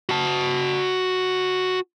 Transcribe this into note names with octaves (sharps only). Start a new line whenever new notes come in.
F#4 A5